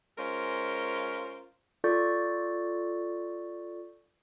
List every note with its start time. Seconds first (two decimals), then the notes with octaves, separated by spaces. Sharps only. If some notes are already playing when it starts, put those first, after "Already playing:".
0.17 G#3 C#4 F4 A#4 C5
1.84 F4 A4 D5 C#6 G6 A6